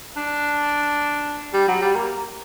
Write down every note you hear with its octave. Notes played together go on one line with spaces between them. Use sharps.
D4
G3
F#3
G3
A#3